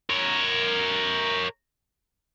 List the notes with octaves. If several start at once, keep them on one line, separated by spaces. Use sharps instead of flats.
A#4 C#5